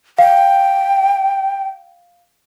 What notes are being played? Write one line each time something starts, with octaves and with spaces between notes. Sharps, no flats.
F5 G5